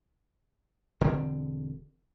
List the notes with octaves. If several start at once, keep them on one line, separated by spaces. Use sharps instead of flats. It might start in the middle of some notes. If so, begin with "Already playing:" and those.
E1 D3 C4